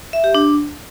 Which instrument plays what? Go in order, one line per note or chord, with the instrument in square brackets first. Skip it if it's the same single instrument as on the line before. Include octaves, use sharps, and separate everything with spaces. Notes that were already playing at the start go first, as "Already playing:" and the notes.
[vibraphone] E5
G4
D4